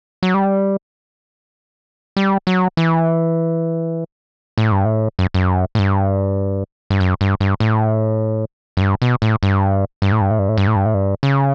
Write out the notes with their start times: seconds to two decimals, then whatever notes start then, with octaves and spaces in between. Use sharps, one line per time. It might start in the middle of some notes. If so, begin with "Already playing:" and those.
0.23 F#3
0.34 G3
2.17 G3
2.47 F#3
2.77 E3
4.58 A2
4.72 G2
4.85 A2
5.19 F#2
5.34 F#2
5.75 A2
5.79 G2
6.90 G2
7.00 F#2
7.21 G2
7.40 G2
7.60 A2
8.77 F#2
8.81 G2
9.02 B2
9.22 A2
9.43 G2
10.02 G2
10.12 A2
10.21 G2
10.31 A2
10.39 G2
10.49 A2
10.58 G2
10.67 A2
10.76 G2
10.85 A2
10.94 G2
11.23 C#3